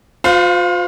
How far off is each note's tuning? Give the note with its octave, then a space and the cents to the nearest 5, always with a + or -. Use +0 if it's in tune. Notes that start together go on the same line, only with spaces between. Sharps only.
F4 +35 C5 -35 F5 +0